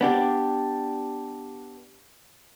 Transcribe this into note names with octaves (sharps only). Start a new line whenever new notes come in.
B3 D4 G4